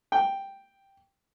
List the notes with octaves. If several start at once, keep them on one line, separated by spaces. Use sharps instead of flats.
G5